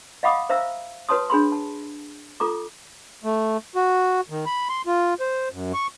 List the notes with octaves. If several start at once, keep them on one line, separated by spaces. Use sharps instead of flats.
D#5 F5 F#5 B5 D6 D#6
C5 E5 F5 A#5 E6
F#4 B4 C#5 A5 C6 D#6
D4 G#4 B5 C6
A5
F4 A4 A#5 D6
A3
F#4
D#3
B5
C6
F4
C5
F#2
C#6